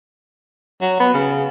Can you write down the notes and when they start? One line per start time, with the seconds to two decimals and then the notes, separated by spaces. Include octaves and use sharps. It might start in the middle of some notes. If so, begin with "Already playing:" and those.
0.82 F#3
1.00 B3
1.14 C#3